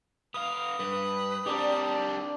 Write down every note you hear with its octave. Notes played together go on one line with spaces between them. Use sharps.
B3 F5 D#6
G2 B4
G3 C4 D4 G4 A#4 D5